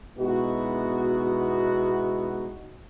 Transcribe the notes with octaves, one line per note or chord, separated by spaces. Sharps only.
B2 G#3 B3 D#4 E4 F#4